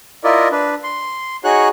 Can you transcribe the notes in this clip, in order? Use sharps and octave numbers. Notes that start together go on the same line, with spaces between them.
E4 F4 A#4 D5 D#5
D4 B4
C6
D#4 F#4 G#4 C#5 F#6